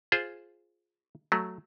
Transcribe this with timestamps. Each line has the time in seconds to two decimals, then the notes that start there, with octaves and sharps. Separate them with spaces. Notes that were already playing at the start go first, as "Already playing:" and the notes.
0.12 F4 G#4 C5
1.32 F#3 A3